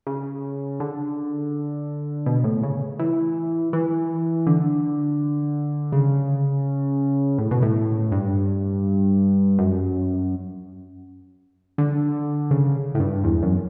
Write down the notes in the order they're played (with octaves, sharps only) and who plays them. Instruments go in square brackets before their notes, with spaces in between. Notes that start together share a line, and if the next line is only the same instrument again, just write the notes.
[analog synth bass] C#3
D3
B2
A2
C#3
E3
E3
D3
C#3
A2
B2
A2
G2
F#2
D3
C#3
A2
G2
E2
F#2